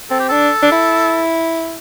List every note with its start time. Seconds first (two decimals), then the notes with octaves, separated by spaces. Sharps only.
0.11 C4 A4
0.20 G4
0.29 D4 A4
0.63 D4
0.72 E4